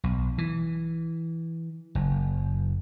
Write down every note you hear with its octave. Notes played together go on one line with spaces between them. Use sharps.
B1
E3
F#1